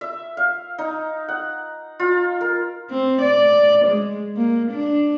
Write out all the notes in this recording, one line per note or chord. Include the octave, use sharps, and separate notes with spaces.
E5
F5
D#4
F#5
F4
A#4
C4
D5
G#3
A#3
D4